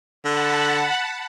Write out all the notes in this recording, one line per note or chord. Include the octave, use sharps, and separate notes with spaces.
D3 F#5 A5 B5